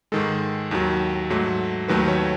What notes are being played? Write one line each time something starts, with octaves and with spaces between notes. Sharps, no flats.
G#2 D#3 G#3 A4
D#2 D#3 F#3
G#2 F#3 A3
D#2 D#3 F#3 A3 B4
C#5